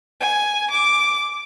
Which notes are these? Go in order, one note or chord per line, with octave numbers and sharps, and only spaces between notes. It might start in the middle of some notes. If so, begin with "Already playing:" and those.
G#5
D6